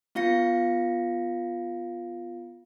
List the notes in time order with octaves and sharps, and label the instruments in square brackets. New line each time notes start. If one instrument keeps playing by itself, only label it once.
[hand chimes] B3 F4 F5 A#6 C#7